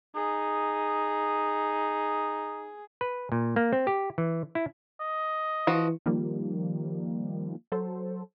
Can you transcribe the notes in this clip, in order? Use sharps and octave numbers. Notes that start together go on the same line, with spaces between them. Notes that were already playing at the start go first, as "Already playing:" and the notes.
D#4 G#4
B4
A#2
A#3
C4
G4
E3
E4
D#5
E3 F3 F#4
D#3 F3 G3 A#3
F#3 A4 C5